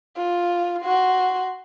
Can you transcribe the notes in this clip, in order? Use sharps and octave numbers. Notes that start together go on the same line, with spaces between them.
F4
F#4 C6